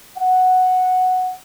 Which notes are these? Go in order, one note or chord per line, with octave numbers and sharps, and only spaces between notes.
F#5